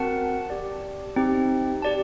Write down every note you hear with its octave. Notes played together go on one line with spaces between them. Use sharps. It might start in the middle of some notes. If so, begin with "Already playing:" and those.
Already playing: C4 F#4 A#4 F#5 A5
G4 D5 A5
C4 D#4 G4
G4 D5 A5